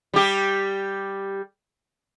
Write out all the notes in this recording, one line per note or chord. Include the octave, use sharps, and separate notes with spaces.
G3 G4